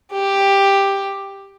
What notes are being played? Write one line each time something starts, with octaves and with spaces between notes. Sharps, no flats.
G4